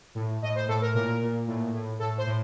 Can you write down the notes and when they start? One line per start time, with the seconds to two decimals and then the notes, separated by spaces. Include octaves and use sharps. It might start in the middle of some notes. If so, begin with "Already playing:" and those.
0.15 A2
0.42 A2 D#5
0.55 C5
0.68 A2 A4
0.82 A#4
0.94 A#2 A#4
1.21 A#2
1.47 A2
1.74 A2
1.99 A2 A4
2.18 C5
2.27 A2